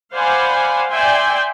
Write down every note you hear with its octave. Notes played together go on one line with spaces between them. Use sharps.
C5 D5 F5 F#5 G#5 B5
D5 E5 G5 G#5 C6